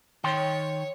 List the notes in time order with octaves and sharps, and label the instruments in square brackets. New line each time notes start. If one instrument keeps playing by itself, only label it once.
[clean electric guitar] D#3 G5 C6 [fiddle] C#5